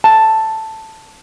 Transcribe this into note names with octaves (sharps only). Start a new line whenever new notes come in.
A5